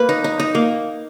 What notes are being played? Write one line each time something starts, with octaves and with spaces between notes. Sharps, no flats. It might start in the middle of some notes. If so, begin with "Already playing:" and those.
Already playing: A#3 B4
D#4
D#4
D#4
A#3